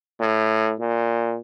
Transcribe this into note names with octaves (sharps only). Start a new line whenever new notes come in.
A2
A#2